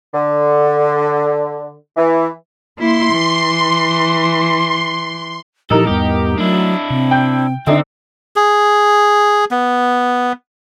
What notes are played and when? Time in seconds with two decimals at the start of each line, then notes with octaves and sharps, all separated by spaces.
0.13 D3
1.97 E3
2.79 A#3 E4 C6
3.13 E3
5.71 A#2 E3 F3 D#4 G4 A4 A#4
5.87 E2 G#2 G3 B3 G4
6.38 F#3 A3 D4 E4
6.90 C3 C4
7.11 G5 G6
7.67 D3 C4 D4 D#4 A4 E5
8.36 G#4
9.51 B3